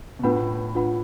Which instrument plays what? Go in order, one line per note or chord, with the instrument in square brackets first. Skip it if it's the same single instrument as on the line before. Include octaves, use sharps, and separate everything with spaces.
[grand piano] B2
[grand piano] A2 [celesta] D4 F4 B4 F#5 B5
[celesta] D4 F4 B4 F#5 B5